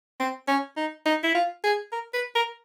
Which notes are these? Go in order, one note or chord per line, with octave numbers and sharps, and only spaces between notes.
C4
C#4
D#4
D#4
E4
F4
G#4
A#4
B4
A#4